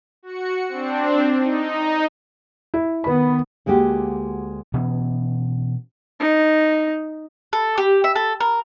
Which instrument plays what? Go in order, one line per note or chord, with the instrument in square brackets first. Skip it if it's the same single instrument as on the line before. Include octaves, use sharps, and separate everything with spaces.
[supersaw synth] F#4 C#7
C4 D4
D#4
[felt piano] E4
[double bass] D#3 B3 [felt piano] B4 B5
[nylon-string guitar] D2 G#3 A#3 F#4 G4
[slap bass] B2 E3 B3 C#4
[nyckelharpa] D#4
[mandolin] A4
G4
E5
A4
A#4